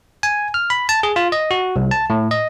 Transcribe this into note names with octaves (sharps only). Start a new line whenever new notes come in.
G#5
F6
B5
A5
G#4
F4
D#5
F#4
C2
A5
A2
D#5